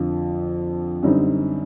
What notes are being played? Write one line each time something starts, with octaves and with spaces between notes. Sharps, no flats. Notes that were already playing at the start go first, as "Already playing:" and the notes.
Already playing: F2 D3 F3
F#2 D3 G3 C4 D#4